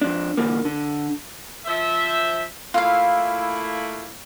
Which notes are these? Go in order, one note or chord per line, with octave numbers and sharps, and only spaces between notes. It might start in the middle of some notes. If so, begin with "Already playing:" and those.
F2 D4
A#2 D3 E3 A#3
D3
F3 C5 E5
A3 A#3 E4 F4 F5